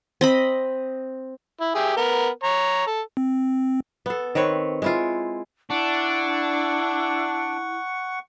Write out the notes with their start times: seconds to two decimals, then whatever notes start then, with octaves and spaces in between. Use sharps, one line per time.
0.21 C4 D#5 B5
1.60 E4
1.75 G4 G#4 E5
1.97 B3 A#4
2.43 C#5 A#5
2.87 A4
3.17 C4
4.06 B3 A4
4.35 D#3 C4 B4 C#5
4.82 G#3 E4 F4
5.70 D4 E4 F#5 C#6